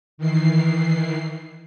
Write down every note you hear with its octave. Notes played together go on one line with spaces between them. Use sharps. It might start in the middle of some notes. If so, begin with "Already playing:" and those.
D#3 E3 C7